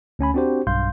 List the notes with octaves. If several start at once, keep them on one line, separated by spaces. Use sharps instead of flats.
D2 C#4 G#5 B5
C4 D4 F#4 G4 C5
B1 G2 F5 C6 G6